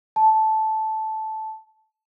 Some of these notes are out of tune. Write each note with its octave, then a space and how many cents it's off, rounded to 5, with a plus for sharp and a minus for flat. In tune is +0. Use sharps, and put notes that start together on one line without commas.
A5 -10